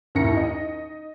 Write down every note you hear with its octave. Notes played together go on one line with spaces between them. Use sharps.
A1 D#2 E4 A#4 A#6 C#7
D#4 D#5